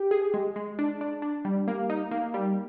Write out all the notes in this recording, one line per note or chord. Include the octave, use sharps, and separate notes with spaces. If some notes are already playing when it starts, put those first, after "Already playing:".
Already playing: G4
G#4
G#3
G#3
D4
D4
D4
G3
A#3
D#4
A#3
G3